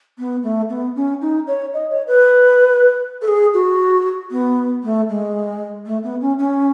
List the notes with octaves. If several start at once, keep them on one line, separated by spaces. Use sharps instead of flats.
B3
A3
B3
C#4
D#4
C#5
D#5
C#5
B4
A4
G#4
F#4
B3
A3
G#3
A3
B3
C#4
C#4